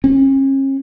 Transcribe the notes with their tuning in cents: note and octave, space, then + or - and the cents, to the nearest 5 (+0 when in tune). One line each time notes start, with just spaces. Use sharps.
C#4 -40